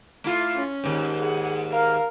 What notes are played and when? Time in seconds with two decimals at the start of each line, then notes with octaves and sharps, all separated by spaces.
0.24 A3 E4 F4
0.55 C#4
0.84 D#2 G#2
1.19 G#4 F#5
1.71 A#4 F5